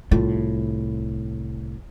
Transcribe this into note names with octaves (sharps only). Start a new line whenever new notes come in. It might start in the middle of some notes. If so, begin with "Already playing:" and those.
C2 A2 F4